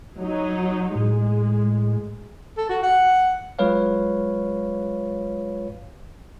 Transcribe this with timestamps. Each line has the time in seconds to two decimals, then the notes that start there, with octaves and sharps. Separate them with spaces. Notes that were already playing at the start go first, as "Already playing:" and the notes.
0.17 F#3 D#4
0.95 A2 G#3
2.57 A4
2.69 F#4
2.83 F#5
3.59 F#3 G#3 F4 B4 C#5 F5